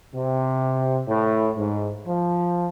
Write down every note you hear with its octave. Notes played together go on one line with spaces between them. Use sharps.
C3
A2
G#2
F3